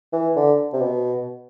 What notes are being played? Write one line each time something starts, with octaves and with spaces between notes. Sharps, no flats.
E3
D3
C3
B2